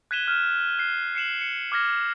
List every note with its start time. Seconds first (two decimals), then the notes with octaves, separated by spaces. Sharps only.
0.11 F#6 G#6 B6 D#7 E7 G7
0.28 F6 E7
0.79 F#6 C7
1.15 C7 C#7 E7 F#7
1.41 C#7
1.72 D6 F6 G#6 A#6